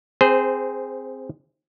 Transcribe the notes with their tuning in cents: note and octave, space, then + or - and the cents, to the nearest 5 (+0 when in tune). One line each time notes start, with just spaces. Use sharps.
C4 +0 G#4 -5 C5 -20